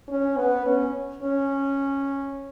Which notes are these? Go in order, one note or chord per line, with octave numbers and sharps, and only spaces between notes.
C#4
B3
C#4
C#4